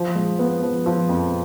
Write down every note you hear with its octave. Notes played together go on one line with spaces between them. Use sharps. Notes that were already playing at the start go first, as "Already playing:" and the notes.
Already playing: F3
G#3
B3
F3
F3
F2